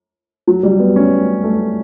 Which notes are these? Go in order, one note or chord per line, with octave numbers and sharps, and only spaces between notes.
F#3
G3
B3
C#4
A3